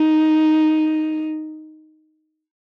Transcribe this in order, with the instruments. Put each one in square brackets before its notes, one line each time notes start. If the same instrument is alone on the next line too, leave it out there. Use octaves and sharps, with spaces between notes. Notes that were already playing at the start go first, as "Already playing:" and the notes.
Already playing: [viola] D#4